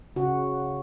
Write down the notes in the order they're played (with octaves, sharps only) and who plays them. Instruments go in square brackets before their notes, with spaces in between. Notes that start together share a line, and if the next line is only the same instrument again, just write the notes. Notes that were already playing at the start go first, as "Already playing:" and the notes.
[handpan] C#3 F#4